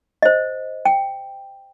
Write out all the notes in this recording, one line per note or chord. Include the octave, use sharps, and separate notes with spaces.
C5 D#5
G5